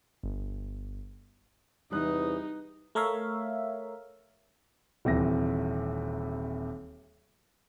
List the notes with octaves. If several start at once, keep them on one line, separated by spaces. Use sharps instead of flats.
G1
E2 C3 E3 G3 D#4 D#6 F#6
A3 A#4 C#5 E5 F5
D#1 C3 E3 A#6